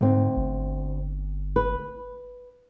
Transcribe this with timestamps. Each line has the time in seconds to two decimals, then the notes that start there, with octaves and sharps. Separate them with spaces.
0.01 D2 G#2 C4
0.37 G1
1.56 B4